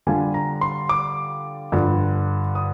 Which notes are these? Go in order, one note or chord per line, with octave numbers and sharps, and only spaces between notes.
D3 G3 D4 F4 G#5
A#5
C6
D6
G2 D3 F3
D#6